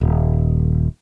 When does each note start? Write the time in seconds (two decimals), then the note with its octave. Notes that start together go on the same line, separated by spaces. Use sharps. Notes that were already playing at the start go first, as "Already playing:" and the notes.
0.01 D#1